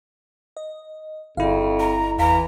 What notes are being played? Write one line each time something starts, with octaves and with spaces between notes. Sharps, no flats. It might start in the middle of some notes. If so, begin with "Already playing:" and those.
D#5
G1 F2 E4 F5
A#5
E2 E3 F5 A#5 B6